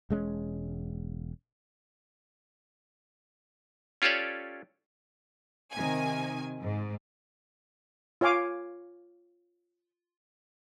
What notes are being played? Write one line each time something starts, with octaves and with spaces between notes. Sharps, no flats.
E1 G#3 C#4
C#4 F4 G4 A4 C#5 D5
C3 D#3 G#5
G#2
F4 C#5 F5 G#5 D6